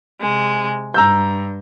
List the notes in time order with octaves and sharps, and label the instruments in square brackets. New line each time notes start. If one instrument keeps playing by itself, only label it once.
[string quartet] C3 G#3
[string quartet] G2 [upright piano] A#5 E6 G6